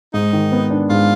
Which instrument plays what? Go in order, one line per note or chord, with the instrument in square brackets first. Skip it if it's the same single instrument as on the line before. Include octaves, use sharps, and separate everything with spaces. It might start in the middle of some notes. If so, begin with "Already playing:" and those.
[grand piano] G#2 [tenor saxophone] D#4
[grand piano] D#3
B3
D4
[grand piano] G#2 [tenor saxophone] F4